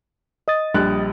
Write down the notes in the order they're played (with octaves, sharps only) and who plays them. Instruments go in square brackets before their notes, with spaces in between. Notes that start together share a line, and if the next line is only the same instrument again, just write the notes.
[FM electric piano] D#5 D#6 A6
[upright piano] A#1 G3 F#6